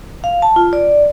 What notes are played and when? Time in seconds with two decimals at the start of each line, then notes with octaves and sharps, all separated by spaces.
0.24 F5
0.42 A5
0.56 F4
0.73 D5